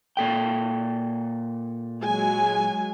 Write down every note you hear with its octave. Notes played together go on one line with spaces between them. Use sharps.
A#2 A4 G5
F#3 G#3 G#5